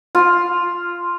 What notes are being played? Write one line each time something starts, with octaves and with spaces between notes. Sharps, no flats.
F4